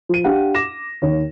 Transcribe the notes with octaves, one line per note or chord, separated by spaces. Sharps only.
F3 D#7
D4 G4 F5 F#5
D6 A#6 E7
D#2 C#5